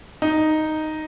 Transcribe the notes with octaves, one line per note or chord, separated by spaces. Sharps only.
D#4